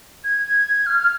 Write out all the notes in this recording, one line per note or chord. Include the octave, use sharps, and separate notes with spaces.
G#6
F6
F6